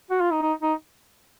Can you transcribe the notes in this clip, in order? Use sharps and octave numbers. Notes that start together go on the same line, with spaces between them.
F#4
F4
D#4
D#4
D#4